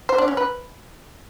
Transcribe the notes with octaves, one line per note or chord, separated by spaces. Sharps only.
C5
D4
C#4
B4